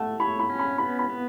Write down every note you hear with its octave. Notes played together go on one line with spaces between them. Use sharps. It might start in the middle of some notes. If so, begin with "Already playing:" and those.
Already playing: A3 F#5 A5
C#5 B5
B5
C#4
B5
B3 B5
B5
B3